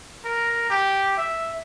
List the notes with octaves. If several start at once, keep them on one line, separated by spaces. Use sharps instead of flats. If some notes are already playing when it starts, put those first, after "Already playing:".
A#4
G4
E5